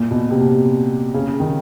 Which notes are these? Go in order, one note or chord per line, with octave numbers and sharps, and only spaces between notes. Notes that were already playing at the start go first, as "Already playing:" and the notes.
Already playing: A#2
B2
C3
C#3
D#3